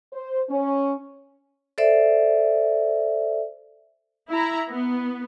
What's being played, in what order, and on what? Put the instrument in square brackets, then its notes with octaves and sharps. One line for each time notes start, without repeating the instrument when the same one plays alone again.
[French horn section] C5
C#4
[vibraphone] A4 C5 D5 E5
[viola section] E4 A#5
B3